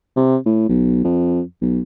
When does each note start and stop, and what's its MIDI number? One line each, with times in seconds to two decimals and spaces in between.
0.16 0.36 48
0.46 0.68 45
0.69 1.00 35
1.04 1.41 41
1.61 1.80 35